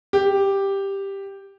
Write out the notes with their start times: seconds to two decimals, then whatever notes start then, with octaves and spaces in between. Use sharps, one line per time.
0.13 G4